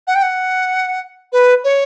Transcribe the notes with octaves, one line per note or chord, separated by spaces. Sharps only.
F#5
G5
F#5
B4
C#5